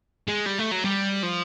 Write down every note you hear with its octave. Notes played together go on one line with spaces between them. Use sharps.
G#3
G3
A3
F#3
G3
F3